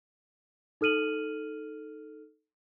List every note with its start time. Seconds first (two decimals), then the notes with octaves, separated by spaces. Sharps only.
0.81 D#4 A4 F6 D#7 F#7